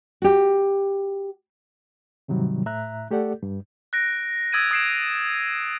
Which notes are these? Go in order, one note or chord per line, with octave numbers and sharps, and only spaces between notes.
F#4 G4
G#2 C3 D#3 F#3 G3
A2 E5 A#5 F#6
A3 G4 A4 D5 F#5
G2
F#6 A#6 D7
D#6 E6 G#6 A6 D7 D#7
D#6 G#6 C7 D7 E7